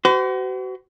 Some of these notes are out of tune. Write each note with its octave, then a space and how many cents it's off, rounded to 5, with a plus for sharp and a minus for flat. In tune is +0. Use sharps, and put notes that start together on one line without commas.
F#4 +35 C5 -45